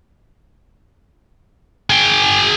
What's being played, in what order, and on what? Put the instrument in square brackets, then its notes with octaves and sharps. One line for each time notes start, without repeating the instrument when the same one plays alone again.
[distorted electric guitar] G#4 G5